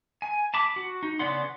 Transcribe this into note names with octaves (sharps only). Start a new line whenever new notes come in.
G#5
A5 B5 D6
F#4
D#4
C#3 B3 D5 F#5 C6